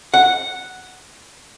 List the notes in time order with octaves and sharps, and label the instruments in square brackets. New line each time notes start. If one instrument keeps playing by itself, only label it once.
[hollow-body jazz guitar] F#5